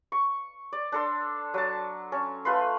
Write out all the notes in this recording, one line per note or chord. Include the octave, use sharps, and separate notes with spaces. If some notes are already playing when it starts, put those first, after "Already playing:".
C#6
D5
D4 A4 C6
F#3 A5
C#4 A5
A3 F4 B4 C6